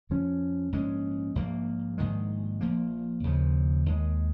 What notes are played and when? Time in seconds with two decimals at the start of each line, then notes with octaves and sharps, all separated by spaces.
0.10 F2 F3 C#4
0.72 A#1 G#2 G#3 C#4
1.35 A#1 G#2 F3 A#3
1.98 A#1 G#2 D#3 G#3
2.61 A#1 A#2 F3 A#3
3.23 D#2 C#3 F3
3.86 D#2 D#3 G#3